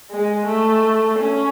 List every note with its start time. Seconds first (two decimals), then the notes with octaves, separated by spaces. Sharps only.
0.11 G#3
0.47 A3
1.19 C#4